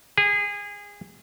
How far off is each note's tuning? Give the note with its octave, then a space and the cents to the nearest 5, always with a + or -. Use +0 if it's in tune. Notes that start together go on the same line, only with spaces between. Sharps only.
G#4 -25